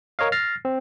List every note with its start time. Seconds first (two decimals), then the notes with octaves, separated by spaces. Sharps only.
0.19 A#4 C#5 D#5 F5
0.32 F6 A6 A#6 C7
0.65 C4